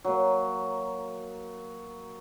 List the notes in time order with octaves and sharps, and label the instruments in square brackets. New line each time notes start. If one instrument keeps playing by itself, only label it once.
[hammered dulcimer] F#3 A#3